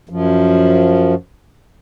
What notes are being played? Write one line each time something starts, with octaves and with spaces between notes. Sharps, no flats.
F#2 F3